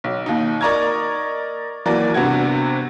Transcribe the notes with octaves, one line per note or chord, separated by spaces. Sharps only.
B1
D#2 D#4
A#4 D5 D#5 A#5 C#6 G#6
D#2 E3 F#3 A#4 D5
G2 C3 B3 C4 F#4 G#6